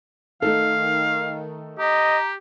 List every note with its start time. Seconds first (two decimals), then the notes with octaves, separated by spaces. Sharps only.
0.42 D#3 A3 D#4 A4 F5
1.79 G4 D#5 A#5